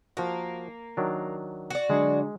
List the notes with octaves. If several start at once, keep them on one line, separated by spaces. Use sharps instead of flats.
F3 A#3 F#4
D#3 F#3 D4
F#4 D5
D3 F#3 G#3 G#4